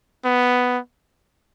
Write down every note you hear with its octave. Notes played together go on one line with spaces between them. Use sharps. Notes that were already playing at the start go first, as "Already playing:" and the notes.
B3